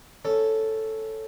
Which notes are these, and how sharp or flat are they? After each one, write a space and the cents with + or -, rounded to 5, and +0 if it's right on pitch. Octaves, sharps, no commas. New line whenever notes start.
C#4 +0 A4 +0